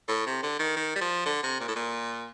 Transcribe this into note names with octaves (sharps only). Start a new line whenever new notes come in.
A2
C3
D3
D#3
D#3
G3
F3
D3
C3
A#2
A2
A#2